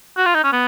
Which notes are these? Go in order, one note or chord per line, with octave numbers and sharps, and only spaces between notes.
F#4
F4
D#4
C#4
B3